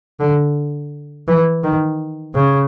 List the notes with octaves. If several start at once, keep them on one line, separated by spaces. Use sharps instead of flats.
D3
E3
D#3
C#3